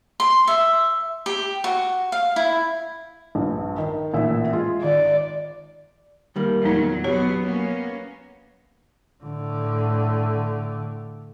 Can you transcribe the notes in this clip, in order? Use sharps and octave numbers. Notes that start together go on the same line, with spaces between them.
C6
E5
G4
F#4
F5
E4
A#1 G2
D#3
A1 A#2 E5
G#3 F4 G#4
G#1 D5
D#3 G3 A#3
E2 A#2 F#3 D#4
B2 F#3 B3 G4 C#5
A#3 B3 C#4
A2 D3